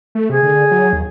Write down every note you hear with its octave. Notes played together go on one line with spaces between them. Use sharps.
A3
C3 G#4
D3
F#3
D#2